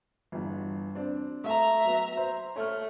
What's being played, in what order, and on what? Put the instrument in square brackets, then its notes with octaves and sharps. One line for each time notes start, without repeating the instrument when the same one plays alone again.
[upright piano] G1 E2
C4 D4
[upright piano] A3 A4 [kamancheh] E5 A#5
[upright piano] F#3 B3
C5
[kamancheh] A3 [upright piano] C#5 F6